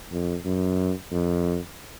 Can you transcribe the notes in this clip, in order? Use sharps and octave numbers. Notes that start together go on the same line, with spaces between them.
F2
F#2
F2